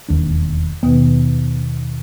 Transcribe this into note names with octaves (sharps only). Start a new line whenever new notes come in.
E1 D#2 D4
D#2 B2 D#3 B3